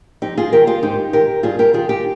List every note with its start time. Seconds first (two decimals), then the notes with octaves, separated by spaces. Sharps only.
0.22 F2 D#4 G4
0.38 F4 G#4
0.53 D#3 G4 A#4
0.67 F4 G#4
0.82 G#2 D#4 G4
1.13 D#3 G4 A#4
1.43 G2 F4 G#4
1.59 G4 A#4
1.73 D#3 F4 G#4
1.89 D#4 G4